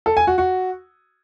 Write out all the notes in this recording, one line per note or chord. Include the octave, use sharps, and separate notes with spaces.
A4
G#5
F#4
F#4